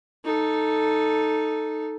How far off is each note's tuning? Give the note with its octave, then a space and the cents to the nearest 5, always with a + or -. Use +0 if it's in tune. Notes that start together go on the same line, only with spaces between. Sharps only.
D#4 +0 A4 +0